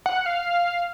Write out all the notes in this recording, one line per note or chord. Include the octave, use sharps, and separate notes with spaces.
F#5
F5